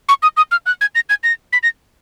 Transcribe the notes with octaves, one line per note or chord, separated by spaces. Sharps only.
C#6
D#6
D#6
F6
F#6
G#6
A#6
G#6
A#6
B6
A#6